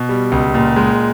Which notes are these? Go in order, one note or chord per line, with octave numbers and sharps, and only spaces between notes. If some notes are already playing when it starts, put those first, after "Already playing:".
Already playing: B2
G3
C#2
A#2
G#3